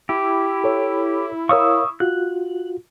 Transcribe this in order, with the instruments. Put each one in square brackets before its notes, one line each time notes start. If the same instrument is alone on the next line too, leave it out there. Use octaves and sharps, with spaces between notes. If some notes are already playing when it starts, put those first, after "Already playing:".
[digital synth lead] E4 [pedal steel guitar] G4
[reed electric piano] A4 C#5
[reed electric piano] A#4 C#5 F5 [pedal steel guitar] C#6 D#6 E6
[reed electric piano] F4 F#4 [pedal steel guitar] F#6